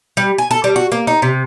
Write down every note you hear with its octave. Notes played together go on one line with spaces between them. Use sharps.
G3
G#5
A4
G3
F#4
A#3
D#4
C3